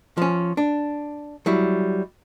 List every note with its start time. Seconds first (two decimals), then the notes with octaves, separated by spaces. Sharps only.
0.17 F3 C#4
0.57 D4
1.46 F#3 G3 E4